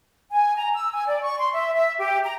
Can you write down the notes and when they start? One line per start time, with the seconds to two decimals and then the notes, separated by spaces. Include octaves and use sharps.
0.31 G#5
0.56 A#5
0.75 E6
0.92 G#5
1.07 D5
1.23 C#6
1.39 C6
1.53 E5
1.75 E5
1.99 G4
2.25 A#5